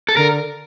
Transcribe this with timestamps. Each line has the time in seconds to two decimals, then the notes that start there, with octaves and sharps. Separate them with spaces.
0.09 A4
0.17 D3 A#4